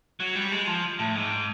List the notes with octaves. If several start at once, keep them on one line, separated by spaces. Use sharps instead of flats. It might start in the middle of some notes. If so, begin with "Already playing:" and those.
F#3
G3
G#3
F3
A2
G#2